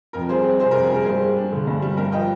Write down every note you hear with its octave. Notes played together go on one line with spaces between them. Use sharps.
F2 A#4
G3 G#4 C5
C4
C3 G#4 C5
A#4
F2
G#4
G3 A#4
G2 G#4 C5
G3
D4
D3
G2
G3
G2 A#4
F3 D#5 G5